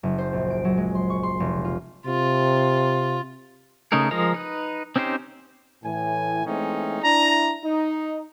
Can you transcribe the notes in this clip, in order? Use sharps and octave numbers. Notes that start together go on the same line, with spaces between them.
F#1
C5
A#1
D7
F#3
G#3
C6
C#6
C6
F1
F4
C3 F4
C#3 A3 D#4 G#4 A#4
F3 G#3 A#4 D#5 A#5
D#4 B4
C4 C#4 D#4 G4 C5
A2 E3 G#5
E3 G#3 A3 C4 C#4 D#4
D4 E4 A#5
D#4